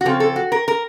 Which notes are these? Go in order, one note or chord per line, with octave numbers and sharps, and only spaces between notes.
F#4
C#3 F3 C4 A4
A4
F#4
A#4
A#4